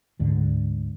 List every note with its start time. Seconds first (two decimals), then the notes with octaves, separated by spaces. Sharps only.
0.19 D2 G#2 D3